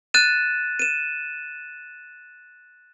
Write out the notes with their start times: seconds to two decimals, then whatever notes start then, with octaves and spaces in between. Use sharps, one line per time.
0.14 F#6 A6 D#7 E7
0.79 D#7 E7